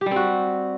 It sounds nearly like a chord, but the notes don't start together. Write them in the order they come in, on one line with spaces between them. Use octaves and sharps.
G4 G3 C4 F#4